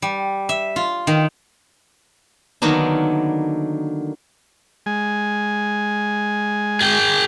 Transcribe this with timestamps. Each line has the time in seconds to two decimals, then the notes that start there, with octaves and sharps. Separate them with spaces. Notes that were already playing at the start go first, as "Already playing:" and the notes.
0.02 G3
0.49 E5
0.76 F4
1.07 D#3
2.62 D3 D#3 F#3 A#3 B3 D4
4.86 G#3 G#5
6.81 G#4 G5